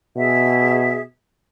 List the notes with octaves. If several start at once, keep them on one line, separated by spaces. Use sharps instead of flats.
B2 G#4 E5